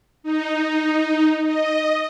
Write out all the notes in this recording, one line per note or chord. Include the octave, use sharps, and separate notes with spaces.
D#4
D#5